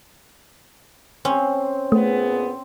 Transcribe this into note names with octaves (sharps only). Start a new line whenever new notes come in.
C4 C#4
A#2 A3 B3 G#4